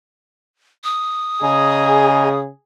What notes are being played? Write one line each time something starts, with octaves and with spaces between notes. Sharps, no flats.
D#6
C#3 G#4 D#5 G#5 A#5